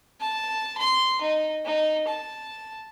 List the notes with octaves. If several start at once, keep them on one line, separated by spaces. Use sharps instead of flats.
A5
C6
D#4
D#4
A5